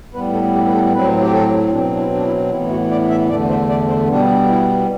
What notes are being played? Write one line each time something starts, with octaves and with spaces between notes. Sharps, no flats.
A2 G3 B3 B4
A4
G4
B4
A4
A2 F#3 C4 B4
G4
A4
B2 F#3 C4 D4
D4
E4
D4
E4
A2 E3 B3 E4
F#4
D5
E5
E2 D3 A3 D5
C5
D5
C5
B2 G3 B3 D4
E4